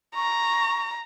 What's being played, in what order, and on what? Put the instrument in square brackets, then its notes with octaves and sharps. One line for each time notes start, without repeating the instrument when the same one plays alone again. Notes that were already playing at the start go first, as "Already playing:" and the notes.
[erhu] A#5 [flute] C#6